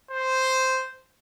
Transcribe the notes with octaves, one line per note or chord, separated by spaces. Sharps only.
C5